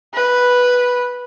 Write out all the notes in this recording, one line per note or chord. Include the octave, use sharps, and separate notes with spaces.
B4